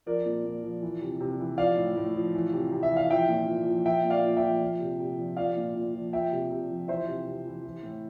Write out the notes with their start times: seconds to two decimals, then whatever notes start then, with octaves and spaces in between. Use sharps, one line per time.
0.06 F3 A#4 D5
0.25 A#2
0.45 A#2
0.63 F3
0.82 E3
1.02 C3
1.20 C3
1.39 E3
1.58 F3 D5 F5
1.77 A2
1.96 A2
2.15 F3
2.35 E3
2.53 C3
2.72 C3
2.83 E5
2.91 E3
2.97 F5
3.10 F3 E5 G5
3.29 A#2
3.47 A#2
3.66 F3
3.85 F3 E5 G5
4.05 A#2
4.10 D5 F5
4.24 A#2
4.37 E5 G5
4.42 F3
4.61 F3
4.80 C3
4.99 C3
5.18 F3
5.37 F3 D5 F5
5.57 A#2
5.75 A#2
5.94 F3
6.13 F3 E5 G5
6.32 C3
6.51 C3
6.70 F3
6.88 E3 C5 E5
7.08 C3
7.26 C3
7.45 E3
7.64 E3
7.83 A2